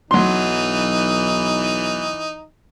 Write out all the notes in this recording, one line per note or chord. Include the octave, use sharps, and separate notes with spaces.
B1 E3 F#3 D#4 C6